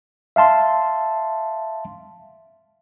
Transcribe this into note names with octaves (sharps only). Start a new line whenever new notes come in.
E5 F5 A5 C6